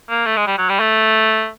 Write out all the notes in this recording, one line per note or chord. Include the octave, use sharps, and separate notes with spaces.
A#3
A3
G#3
G3
F#3
G3
A3